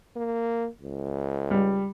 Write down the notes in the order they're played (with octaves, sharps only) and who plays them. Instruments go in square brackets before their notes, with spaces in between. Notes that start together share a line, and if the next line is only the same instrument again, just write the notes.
[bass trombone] A#3
C#2
[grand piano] G3